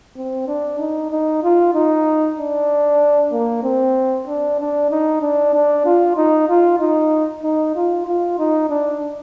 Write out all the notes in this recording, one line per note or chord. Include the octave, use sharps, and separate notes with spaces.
C4
D4
D#4
D#4
F4
D#4
D4
A#3
C4
D4
D4
D#4
D4
D4
F4
D#4
F4
D#4
D#4
F4
F4
D#4
D4